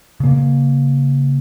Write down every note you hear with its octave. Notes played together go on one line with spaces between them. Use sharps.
C#3 A#3